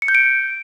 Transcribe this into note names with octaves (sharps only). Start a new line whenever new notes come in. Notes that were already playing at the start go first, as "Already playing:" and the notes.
C#7
G6
D7